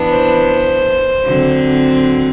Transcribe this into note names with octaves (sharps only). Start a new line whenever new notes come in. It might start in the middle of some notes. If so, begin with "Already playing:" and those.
Already playing: E3 B3 D4
C5
D3 F#3 C4